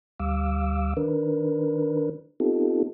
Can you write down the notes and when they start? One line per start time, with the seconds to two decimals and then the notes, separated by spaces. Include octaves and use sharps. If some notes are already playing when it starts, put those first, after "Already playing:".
0.20 D2 G3 F5 D6 E6
0.97 D#3 D4 A#4 B4
2.40 B3 C4 D#4 F4 G4 A4